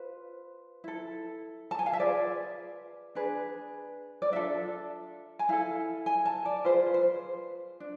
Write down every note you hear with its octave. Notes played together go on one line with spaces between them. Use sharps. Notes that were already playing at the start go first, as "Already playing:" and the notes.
Already playing: F4 B4 C5
E4 A4
A5
G#5
F5
E5
F4 G#4 B4 D5
D4 G#4 B4
D5
D4 F4 A4 E5
G#5
E4 A4 F5
G#5
A5
D5
F4 G#4 B4 C5
C5
D4